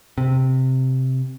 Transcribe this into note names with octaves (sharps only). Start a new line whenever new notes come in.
C3